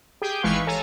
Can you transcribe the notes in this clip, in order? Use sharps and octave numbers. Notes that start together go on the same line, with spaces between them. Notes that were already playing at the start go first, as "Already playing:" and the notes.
G4 G#4 G5
G#1 E3 G#3 B4 F5 C#6
A4 C#5 G#5 A#5